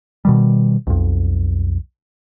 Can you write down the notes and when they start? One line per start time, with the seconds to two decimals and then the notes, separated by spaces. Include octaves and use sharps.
0.25 B2 D#3 G3
0.87 B1 F2